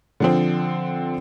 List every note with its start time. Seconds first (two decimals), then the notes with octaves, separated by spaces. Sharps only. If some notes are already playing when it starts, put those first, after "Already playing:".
0.20 D3 F3 C4